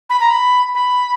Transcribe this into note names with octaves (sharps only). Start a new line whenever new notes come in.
B5
A#5
B5
B5